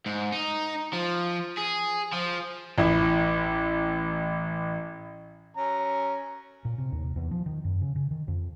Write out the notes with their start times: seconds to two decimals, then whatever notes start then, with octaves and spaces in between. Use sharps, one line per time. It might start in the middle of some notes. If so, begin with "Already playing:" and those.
0.06 G#2
0.32 D#4
0.93 F3
1.58 G#4
2.13 F3
2.78 A1 E4
5.57 C#4 A#5
6.65 A#2
6.78 C3
6.92 D#2
7.16 E2
7.31 F3
7.46 D#3
7.65 F#2
7.82 C#3
7.96 C#3
8.11 D#3
8.28 F2